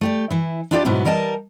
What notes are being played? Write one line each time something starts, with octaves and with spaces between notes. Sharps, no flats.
A3 G4 D5
E3 E4
D4 E4 F4 G4 C#5 D5
G#2 B2 F#3 B3 E4
E3 G3 A#4 D#5 G#5 A5